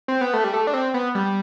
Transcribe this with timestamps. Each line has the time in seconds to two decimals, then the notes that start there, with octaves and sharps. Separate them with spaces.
0.08 C4
0.21 B3
0.33 A3
0.44 G3
0.53 A3
0.67 D4
0.73 C4
0.94 B3
1.15 G3